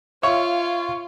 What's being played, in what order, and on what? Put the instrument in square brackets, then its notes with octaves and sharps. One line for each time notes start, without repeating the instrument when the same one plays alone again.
[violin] F4 [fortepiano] C#5 [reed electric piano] E5 F5